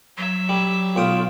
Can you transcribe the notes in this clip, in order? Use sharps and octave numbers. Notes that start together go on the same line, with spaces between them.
F#3 E5
G3
B1 F4 G5 D#6